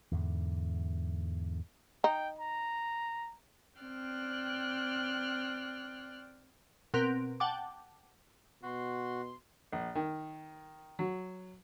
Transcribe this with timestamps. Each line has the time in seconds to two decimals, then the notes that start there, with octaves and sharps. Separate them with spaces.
0.12 E2 G#2 D3
2.04 D#4 G5
2.39 A#5
3.79 C4 D5 G5 F6 F#6
6.94 B2 C4 A#4 F#6 D7
7.40 F#5 G5 A5 D6
8.63 B2 F#4 C6
9.73 A#1
9.95 D#3
10.99 F#3